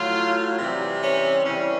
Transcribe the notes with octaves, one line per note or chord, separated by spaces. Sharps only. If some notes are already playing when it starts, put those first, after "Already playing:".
Already playing: A2 F#3 F4
C3 E3 G3
C#4
C#3 E3 G3 C#4